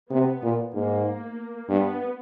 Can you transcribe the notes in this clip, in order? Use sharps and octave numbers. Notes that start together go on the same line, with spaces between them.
C3 B3
A#2
G#2 A#3
G2 B3